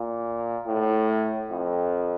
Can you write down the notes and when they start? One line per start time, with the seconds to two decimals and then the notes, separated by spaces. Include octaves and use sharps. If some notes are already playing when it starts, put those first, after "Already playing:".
Already playing: A#2
0.67 A2
1.51 F2